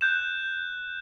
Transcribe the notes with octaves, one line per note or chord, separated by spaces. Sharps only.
F#6 G6 E7